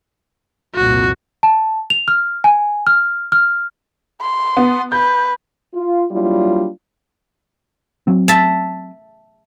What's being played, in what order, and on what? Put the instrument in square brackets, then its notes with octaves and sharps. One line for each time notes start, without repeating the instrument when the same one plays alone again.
[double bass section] C2 F2 A#2 [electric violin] F#4
[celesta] A5
F7
F6
G#5
F6
F6
[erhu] C6
[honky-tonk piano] B3
[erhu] B4 [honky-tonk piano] G6
[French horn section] F4
F#3 G3 A#3 D4 E4 F4
[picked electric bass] F#3 C4
[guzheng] E5 A5